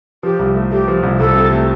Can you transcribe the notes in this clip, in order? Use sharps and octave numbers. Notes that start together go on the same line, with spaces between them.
F3 G4
C2
A3
A3 G4
F3
C2
C2 A4
C3
A3